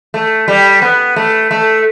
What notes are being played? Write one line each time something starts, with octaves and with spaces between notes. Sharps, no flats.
A3
G3
B3
A3
A3